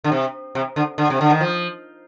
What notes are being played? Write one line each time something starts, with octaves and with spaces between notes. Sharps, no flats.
D3
C3
C3
D3
D3
C3
D3
D#3
F3